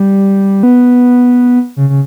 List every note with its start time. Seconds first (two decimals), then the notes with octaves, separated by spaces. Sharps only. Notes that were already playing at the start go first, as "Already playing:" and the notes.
Already playing: G3
0.63 B3
1.76 C#3
1.89 C#3